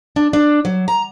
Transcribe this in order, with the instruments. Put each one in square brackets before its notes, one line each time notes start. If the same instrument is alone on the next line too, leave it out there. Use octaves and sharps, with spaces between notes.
[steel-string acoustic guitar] D4
D4
F#3
A#5